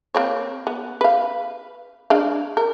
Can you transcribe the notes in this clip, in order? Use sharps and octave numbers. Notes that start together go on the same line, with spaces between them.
A#3 C4 C#5
B3
B4 F5
G#3 D4 F5
A#4